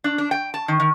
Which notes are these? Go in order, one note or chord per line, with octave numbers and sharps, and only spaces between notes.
D4
D4
G5
A5
D#3
D#3